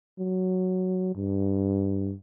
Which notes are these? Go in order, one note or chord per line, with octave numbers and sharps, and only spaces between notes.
F#3
G2